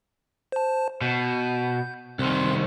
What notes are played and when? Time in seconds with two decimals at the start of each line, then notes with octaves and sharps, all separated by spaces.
0.52 C5 A5
1.01 B2 G6
2.19 C2 D#3 C4 C6